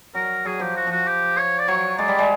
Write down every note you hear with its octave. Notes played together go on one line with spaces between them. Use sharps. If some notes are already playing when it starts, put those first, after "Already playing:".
F#3 A#4
F#3 G#4
F3 G4
F#4
F3 F#4
G4
C#5
D5
F#3 C#5
G#3 D5
G3
G#3